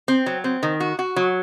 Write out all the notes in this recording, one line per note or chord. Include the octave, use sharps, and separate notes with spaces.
C4
F#3
C4
D#3
F#4
F#4
F#3